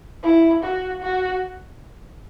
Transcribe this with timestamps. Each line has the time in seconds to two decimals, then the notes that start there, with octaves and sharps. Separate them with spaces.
0.23 E4
0.63 F#4
1.02 F#4